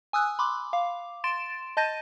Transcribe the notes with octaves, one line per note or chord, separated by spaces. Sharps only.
G#5 D#6 E6 F#6
B5 C6 D6
F5 D6
C6 A6 D7 E7
D#5 A5 G6 A6 A#6 D#7